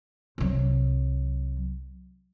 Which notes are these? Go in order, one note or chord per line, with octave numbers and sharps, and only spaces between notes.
C2 F#3